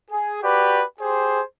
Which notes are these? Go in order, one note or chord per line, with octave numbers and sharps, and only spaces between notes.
G#4
F#4 G4 B4 D5
G4 G#4 C5